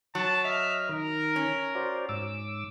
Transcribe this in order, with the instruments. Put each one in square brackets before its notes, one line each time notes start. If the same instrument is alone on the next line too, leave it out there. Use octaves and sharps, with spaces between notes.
[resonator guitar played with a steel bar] F#3 [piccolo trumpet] A5
[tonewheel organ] D#5 F6 [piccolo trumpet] E5
[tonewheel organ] D#3 [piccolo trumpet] A#4
[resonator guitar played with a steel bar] C#4
[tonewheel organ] F#4 C5 D5
G#2 D6 E6